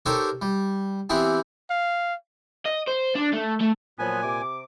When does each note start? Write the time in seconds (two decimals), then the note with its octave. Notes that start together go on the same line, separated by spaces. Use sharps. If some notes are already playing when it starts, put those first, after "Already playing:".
0.06 D#4 G4 A4 A#4 C5 C#5
0.42 G3
1.10 E3 B3 C4 E4 G4 G#4
1.70 F5
2.65 D#5
2.87 C5
3.15 D4
3.33 A3
3.60 A3
3.99 A#2 F3 F#3 B3 G#5
4.22 C3 D6